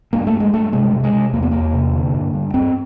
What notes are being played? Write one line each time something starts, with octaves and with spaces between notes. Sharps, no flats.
G2 A#3
A3
G2
G#3
G2 A3
C3 G#3
C3
G#3
C3
E2 A#3
B3
E2 A#3
C3
D3
G2
G2
G2 C4